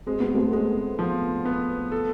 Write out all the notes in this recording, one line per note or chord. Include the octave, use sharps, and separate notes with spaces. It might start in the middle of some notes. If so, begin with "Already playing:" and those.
G#3 C4
B3
A3 C4
G#3 A3 C4
F3
B3
A4